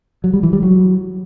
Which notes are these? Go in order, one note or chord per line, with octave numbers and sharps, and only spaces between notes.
F#3
G3
E3
G3
F#3